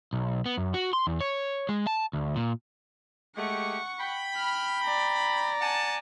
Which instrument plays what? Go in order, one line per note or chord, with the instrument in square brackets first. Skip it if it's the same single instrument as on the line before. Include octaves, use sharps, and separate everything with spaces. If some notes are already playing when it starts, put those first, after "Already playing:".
[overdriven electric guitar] B1
B3
F#2
F#4
C6
E2
C#5
G#3
A5
D2
A#2
[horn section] G#3 A3 G4 [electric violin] F#5 C#6
[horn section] G5 B5
[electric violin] F6
D5 A#5
[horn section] F#5 G#5 A5